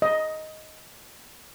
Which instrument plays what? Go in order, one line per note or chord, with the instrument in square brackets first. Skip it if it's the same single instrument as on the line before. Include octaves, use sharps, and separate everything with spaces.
[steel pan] D#5